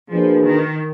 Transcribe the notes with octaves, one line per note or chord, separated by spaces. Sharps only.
B2 F3 A#3 D4 G#4 B4
D#3